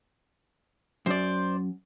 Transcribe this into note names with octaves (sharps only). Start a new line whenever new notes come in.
F#2 C5 D5